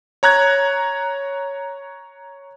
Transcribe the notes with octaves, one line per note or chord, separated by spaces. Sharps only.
C#5 A#5 F#6 G#6